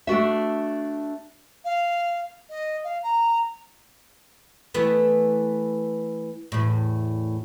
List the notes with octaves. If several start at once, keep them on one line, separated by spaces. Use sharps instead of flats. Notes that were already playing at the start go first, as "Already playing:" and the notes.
A3 D4 F#4 E5
F5
D#5
F5
A#5
E3 A3 B3
E2 A2